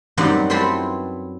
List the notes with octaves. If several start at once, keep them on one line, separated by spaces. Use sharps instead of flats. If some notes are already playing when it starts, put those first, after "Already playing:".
F#2 G3 C4 D#4 F#4 F#5
C4 E4 A4 B4 C5